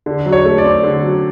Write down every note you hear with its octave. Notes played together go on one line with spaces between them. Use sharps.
D3
F#3
C#5
A3
D5
C4
D3
F#3